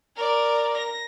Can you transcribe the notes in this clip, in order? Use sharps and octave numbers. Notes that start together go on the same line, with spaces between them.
A#4 D5
A#6